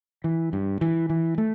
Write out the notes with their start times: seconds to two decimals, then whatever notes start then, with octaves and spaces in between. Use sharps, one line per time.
0.24 E3
0.53 G2
0.81 E3
1.10 E3
1.38 A3